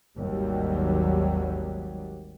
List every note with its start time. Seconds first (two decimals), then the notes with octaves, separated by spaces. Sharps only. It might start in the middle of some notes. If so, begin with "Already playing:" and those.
0.18 G#1 D#2 F#3 G3